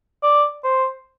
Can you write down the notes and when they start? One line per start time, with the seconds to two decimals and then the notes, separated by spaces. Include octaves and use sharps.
0.23 D5
0.64 C5